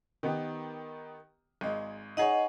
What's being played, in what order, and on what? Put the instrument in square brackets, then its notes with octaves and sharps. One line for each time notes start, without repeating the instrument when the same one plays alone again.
[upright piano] D#3 B3 G4
G#1 G#3
[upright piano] D#4 G#4 C#5 [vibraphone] D#5 F#5